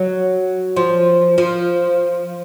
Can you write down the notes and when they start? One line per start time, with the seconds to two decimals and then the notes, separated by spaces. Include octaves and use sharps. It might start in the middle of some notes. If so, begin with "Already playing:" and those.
Already playing: F#3
0.76 F3
1.38 F3